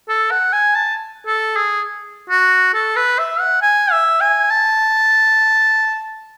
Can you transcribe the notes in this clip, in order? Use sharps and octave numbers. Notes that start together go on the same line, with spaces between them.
A4
F#5
G#5
A5
A4
G#4
F#4
A4
B4
E5
F#5
G#5
E5
G#5
A5